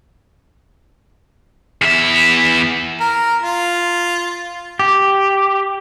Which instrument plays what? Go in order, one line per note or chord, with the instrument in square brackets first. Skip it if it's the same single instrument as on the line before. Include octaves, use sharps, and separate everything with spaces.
[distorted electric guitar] E2 E5
[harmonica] A#4
F4
[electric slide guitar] G4